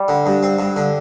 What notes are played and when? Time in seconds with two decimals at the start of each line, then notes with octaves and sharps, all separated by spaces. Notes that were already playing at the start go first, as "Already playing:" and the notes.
Already playing: G3
0.08 D3
0.26 G2
0.43 C4
0.59 G2
0.76 D3